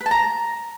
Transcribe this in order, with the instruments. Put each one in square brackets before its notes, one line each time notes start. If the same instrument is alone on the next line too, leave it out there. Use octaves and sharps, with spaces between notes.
[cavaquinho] B4
A5
A#5